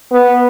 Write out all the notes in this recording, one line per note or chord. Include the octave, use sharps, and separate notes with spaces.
B3